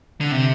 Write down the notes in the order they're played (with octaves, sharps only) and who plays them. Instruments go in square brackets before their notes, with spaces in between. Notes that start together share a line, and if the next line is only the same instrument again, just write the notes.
[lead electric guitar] D3
C3